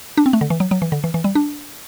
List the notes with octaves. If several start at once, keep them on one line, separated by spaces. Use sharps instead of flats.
D4
C4
A3
D3
E3
F#3
F#3
E3
D3
E3
E3
G3
D4